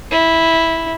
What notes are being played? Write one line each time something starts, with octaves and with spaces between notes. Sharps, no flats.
E4